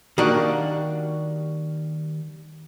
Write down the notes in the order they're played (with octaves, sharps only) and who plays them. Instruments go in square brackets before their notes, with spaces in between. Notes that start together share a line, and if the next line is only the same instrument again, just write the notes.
[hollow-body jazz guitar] D#3 G3 A#3 D4 F#4